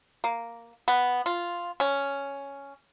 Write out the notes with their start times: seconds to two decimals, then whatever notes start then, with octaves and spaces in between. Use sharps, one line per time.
0.24 A#3
0.88 B3
1.26 F4
1.80 C#4